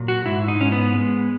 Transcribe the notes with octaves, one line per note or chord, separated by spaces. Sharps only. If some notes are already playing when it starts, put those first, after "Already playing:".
Already playing: A#2 F#3
F#4
G#2 E4
D#4
G#2 C#4
B3
G#3